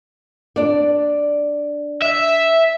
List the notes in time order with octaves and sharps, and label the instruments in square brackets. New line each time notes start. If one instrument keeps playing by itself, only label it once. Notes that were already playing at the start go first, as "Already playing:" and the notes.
[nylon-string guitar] D4 D5
[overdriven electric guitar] E5